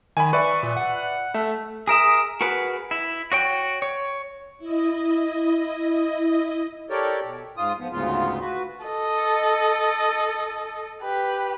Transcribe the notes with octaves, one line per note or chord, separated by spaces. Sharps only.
D#3 G#5 B5
B4 D5 E5 C#6
A#2
F#5
A3 E5
G#4 A#4 E5 D#6
F#4 G#4 A#4 B4 F#5
E4
F#4 C#5 G5
C#5
E4 D#5
G4 A4 A#4 C#5 D5
B2
G#2 F4 D#6
F3 B3
D2 G#2 C#3 B3 F4
F#4 B4
A4 D#5
G4 B4